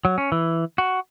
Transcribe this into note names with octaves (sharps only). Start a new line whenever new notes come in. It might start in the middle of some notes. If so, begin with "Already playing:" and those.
F#3
C#4
E3
F#4